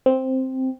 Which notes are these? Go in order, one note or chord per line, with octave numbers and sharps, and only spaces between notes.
C4